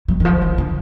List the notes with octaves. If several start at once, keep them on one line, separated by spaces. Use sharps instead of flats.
F#3
D#3
F3
D#3
D3